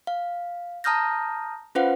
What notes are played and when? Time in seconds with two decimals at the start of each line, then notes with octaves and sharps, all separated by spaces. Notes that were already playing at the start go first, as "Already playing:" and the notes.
0.07 F5
0.84 A5 A#5 D#6 F6 G6 A#6
1.75 C#4 F4 B4 C5 F5 F#5